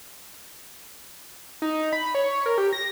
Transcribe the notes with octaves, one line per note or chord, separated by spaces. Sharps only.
D#4
B5
C#5
A#4
G4
A#6